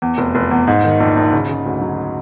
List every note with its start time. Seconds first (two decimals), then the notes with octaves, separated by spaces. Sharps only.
0.02 E2
0.18 F1
0.35 F1
0.51 E2
0.67 G#2
0.84 D#3
1.00 A#1
1.17 A#1
1.33 C#3
1.49 C#3
1.66 D2
1.81 F#3